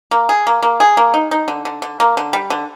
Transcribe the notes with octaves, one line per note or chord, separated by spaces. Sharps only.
A#3
G#4
A#3
A#3
G#4
A#3
D#4
D#4
D3
D3
D3
A#3
D3
G3
D3